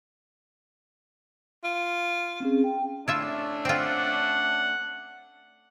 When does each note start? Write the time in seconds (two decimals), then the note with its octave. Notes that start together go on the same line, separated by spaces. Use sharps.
1.64 F4
2.40 C4 C#4 G#4
2.64 G5
3.08 A3 C#4 D4 E4 F4 E5
3.65 C4 F4 F#5